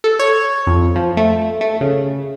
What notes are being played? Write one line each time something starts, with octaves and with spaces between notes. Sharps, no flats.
A4
C#5
F2
F3
A3
A3
C#3